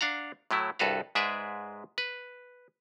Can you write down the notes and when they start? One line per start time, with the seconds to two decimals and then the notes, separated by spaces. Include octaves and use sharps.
0.01 D4 F5 F#5 A#5
0.51 A2 F#3 A3 E4
0.79 C2 G2 F#4 A4 B4 F5
1.15 G#2 G#3 G#4 B4 D5 E5
1.98 B4